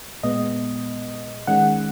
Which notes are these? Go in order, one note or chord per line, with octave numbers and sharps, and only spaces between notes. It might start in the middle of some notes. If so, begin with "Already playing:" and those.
A#2 G#3 B3 D#5
D#3 G#3 C#4 F#5